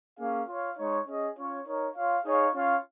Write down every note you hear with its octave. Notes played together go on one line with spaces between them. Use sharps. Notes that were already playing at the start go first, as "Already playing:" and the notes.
A#3 C#4 G#4 F5
F4 C#5 F5
G#3 D#4 C#5
C#4 G#4 D#5
C#4 F4 C#5
D#4 A#4 C#5
F4 C#5 F5
D#4 G#4 C#5 F5
C#4 F4 C#5 F5